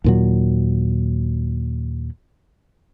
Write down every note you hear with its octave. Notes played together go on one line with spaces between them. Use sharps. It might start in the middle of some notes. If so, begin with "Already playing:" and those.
D#2 A#2 F#3